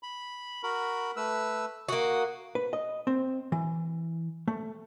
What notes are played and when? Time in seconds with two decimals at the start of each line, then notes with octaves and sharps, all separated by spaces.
0.03 B5
0.63 F#4 A#4 B5
1.16 A3 B4 E6
1.89 A#3 F#4 D#6
2.55 B4
2.73 D#5
3.07 C4
3.52 E3
4.48 A3